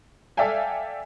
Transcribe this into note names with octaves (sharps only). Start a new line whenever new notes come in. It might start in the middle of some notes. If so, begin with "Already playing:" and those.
A4 D5 E5 F5 G5 G#5